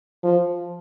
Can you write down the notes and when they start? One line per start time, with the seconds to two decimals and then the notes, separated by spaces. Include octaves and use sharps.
0.23 F3